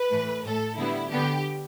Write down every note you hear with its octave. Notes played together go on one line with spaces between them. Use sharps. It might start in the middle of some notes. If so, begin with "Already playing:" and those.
Already playing: B4
A2 E3 A3
A2 A3 A4
D3 G3 B3 E4
D3 B3 G4